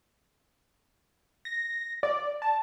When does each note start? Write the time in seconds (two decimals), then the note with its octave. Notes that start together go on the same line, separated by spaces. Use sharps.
1.45 A#6
2.03 D5
2.42 A5